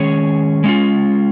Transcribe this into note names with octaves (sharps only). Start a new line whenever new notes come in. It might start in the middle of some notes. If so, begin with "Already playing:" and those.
Already playing: D#3 G#3 C#4 G#4 C#5
G#3 C#4 F4